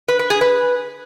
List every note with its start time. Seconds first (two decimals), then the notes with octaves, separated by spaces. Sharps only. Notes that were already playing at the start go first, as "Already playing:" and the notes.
0.08 B4
0.19 B4
0.30 G#4
0.41 B4